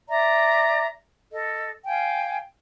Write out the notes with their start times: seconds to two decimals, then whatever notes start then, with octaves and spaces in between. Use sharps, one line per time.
0.09 D5 E5 A#5
1.32 A4 D#5
1.85 F5 G5 G#5